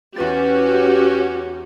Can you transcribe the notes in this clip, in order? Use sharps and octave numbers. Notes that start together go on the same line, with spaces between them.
E2 C#4 F#4 G4 B4 A6